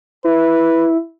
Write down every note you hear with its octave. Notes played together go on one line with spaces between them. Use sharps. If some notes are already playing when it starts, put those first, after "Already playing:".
E4 B4